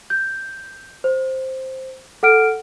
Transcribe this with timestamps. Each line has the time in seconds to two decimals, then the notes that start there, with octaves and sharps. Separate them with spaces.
0.10 G6
1.04 C5
2.23 A4 F#5 F6 D7